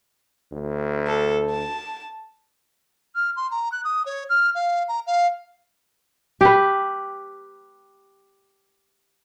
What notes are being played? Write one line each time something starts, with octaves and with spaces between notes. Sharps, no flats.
D2
A4
A5
F6
C6
A#5
F#6
D#6
C#5
F6
F5
A#5
F5
G4 B4